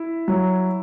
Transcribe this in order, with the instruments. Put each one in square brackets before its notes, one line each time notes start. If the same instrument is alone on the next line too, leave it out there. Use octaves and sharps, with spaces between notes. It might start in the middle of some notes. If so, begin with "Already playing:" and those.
Already playing: [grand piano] E4
[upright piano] F#3